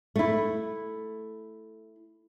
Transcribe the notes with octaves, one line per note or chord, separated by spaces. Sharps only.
A3 E4